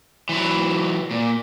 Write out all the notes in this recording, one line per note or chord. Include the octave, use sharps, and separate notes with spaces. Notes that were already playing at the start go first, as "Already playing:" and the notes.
E3 F#3
A#2